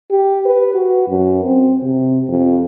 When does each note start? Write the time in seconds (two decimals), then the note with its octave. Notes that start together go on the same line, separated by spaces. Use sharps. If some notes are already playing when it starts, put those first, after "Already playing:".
0.11 G4
0.46 B4
0.74 F#4
1.09 F#2
1.44 C4
1.83 C3
2.29 F2